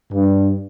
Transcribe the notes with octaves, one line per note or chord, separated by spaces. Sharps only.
G2